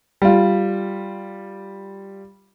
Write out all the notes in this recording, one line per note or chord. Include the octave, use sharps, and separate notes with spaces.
G3 F4